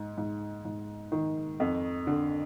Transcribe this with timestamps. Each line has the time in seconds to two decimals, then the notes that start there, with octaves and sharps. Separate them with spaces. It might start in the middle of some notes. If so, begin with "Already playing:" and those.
Already playing: G#2
0.18 G#2
0.65 G#2
1.12 D#3
1.60 F2
2.07 D3